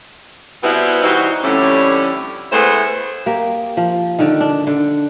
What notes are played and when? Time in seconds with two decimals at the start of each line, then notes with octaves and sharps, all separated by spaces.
0.63 B2 G3 B3 C4 E4
1.02 E3 G3 C4 D#4 F#4
1.43 F2 A2 D3 G3 C#4 E4
2.52 G#3 A3 B3 E4 C5
3.26 A#3 G4
3.77 F3
4.19 D3 D#3
4.41 D4
4.67 D3